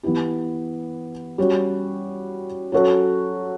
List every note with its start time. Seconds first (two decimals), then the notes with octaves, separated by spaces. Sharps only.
0.03 E3 B3 E4 G4
1.38 G3 C#4 F#4
2.72 F#3 C#4 F#4 A4